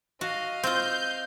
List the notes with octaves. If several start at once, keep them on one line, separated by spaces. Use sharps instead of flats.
F#4 D#5 F5 A5
C4 F4 G6